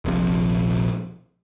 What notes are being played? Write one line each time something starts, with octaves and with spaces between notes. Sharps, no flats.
D#1 A#1 C3 F3